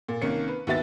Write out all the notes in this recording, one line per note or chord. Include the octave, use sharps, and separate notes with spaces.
A#2
C2 D#3 A#3 C#4 C#7
B4
D#2 B3 F#4 E5 A6